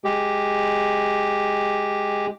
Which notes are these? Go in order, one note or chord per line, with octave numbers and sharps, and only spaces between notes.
G#3 G4